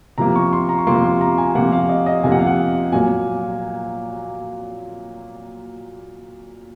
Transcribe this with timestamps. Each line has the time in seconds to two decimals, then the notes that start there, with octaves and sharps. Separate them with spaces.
0.18 C3 F3 A#3 A#5
0.36 C#6
0.53 C6
0.69 A#5
0.78 C#6
0.87 C3 F3 A#3 C6
1.04 C6
1.21 A#5
1.38 G#5
1.55 C3 F3 A#3 F#5
1.72 F5
1.89 D#5
2.06 D#5
2.24 C3 F3 A#3 G#5
2.32 F#5
2.39 F5
2.47 F#5
2.92 A#2 F#3 A#3 G#5